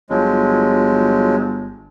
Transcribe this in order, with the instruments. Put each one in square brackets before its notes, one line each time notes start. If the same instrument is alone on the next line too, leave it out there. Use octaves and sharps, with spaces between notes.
[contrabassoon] G1 [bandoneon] F3 F#3 G#3